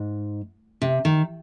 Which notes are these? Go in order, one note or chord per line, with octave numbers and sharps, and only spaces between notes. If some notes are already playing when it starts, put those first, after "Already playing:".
Already playing: G#2
C3
D#3